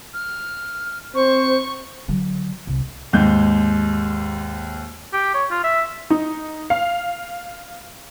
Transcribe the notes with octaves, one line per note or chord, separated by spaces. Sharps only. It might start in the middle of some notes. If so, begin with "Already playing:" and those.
F6
C4 C5 C#6
D3 F#3
C2
D#2 G#2 G#3 G6
G4
C#5
F4
E5
D#4
F5